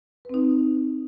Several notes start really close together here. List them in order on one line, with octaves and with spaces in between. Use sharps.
B4 C4 D#4